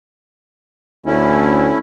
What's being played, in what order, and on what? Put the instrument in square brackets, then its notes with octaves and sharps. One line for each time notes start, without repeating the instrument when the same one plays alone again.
[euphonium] D2 [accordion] A3 C#4 E4